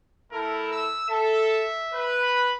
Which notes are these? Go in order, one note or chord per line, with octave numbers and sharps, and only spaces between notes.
A3 E4 A4 A#4
E6
A4 E5
B4
B5